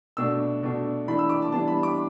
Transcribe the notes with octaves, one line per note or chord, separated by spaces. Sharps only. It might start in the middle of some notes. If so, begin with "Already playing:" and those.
B2 A3 D4 E6
B2 A3 D4
E3 A3 D4 B5
E6
D6
A5
E3 G3 B3 D4 A5
B5
D6